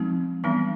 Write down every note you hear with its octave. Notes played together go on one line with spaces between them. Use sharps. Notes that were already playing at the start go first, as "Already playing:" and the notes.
Already playing: F3 G#3 C4 D#4
E3 G3 B3 D4